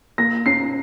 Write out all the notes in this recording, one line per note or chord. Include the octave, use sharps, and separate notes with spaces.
A#3 A#6
C#4 C7